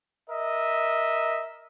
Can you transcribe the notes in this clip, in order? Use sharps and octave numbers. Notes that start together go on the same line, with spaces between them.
A#4 D#5 E5